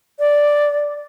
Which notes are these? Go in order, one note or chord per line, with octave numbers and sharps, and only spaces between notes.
D5